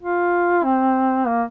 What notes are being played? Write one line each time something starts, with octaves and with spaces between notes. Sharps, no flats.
F4
C4
A#3